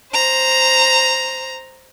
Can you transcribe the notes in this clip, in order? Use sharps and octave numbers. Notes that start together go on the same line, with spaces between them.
C5 A#5